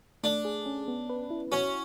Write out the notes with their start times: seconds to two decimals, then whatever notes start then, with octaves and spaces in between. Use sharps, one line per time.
0.23 A3 D4
0.45 G#4
0.66 C#4
0.88 B3
1.10 B4
1.31 E4
1.52 C#4 F#4